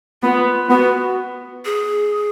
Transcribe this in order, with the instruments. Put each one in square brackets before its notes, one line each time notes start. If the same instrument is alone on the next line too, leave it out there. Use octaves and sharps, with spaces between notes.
[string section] B3 [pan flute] F4
[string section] B3 [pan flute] F#4
[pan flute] G#4